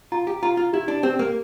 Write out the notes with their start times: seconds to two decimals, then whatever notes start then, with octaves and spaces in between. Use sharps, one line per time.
0.12 F4 A#5
0.27 G4
0.43 F4 A#5
0.57 F4
0.73 E4 G4
0.88 D4
1.03 C4 G4
1.19 A#3